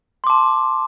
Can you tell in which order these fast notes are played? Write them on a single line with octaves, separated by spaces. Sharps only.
C6 D6 A5